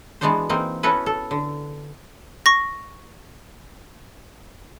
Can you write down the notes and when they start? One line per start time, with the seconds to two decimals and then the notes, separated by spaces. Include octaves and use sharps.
0.21 E3 G#3 B3 D4 F#4 C5
0.49 E3 A#3 C4 D#4
0.83 B3 C#4 E4 F#4 A4 B4
1.06 A4
1.31 D3
2.46 C#6 A#6